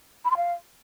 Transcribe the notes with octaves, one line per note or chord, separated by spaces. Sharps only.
B5
C6
F5